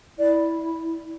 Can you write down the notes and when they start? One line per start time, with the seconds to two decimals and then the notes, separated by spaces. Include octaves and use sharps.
0.17 E4 D5